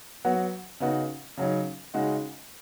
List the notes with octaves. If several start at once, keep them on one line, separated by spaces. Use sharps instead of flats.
F#3 B3 F#4
C#3 B3 D#4 F#4
C#3 F#3 D#4
C#3 G#3 D#4 F#4